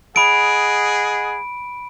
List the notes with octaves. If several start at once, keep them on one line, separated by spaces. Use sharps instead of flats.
G#4 D#5 F#5 B5 D7